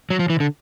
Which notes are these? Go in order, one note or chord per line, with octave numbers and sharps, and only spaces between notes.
F#3
F3
E3
D3